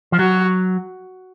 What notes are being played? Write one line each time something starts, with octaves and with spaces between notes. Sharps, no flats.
F3
F#3 F#4